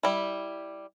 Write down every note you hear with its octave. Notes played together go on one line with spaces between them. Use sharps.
G3 E4